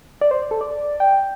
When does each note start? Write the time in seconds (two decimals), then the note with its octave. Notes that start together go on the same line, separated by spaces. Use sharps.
0.21 D5
0.31 C5
0.51 A4
0.61 D5
1.00 G5